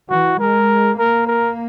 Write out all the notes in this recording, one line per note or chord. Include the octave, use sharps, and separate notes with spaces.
E3 F#4
G#3 A#4
A#3 A#4
A#4